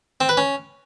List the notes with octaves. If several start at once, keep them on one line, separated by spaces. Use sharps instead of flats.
C4
B4
C#4